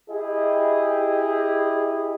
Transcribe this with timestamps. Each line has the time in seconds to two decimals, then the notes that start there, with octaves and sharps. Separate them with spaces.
0.10 E4 G4 G#4 D#5